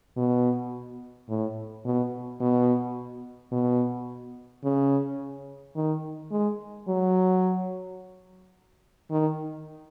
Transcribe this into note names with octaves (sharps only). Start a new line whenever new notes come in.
B2
A2
B2
B2
B2
C#3
D#3
G#3
F#3
D#3